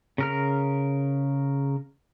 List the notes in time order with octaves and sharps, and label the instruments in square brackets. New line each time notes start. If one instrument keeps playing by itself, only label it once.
[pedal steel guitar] C#3 A#4 F6